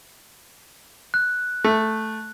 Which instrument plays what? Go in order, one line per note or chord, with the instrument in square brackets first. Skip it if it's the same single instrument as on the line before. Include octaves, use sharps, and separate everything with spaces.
[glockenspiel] F#6
[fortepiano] A3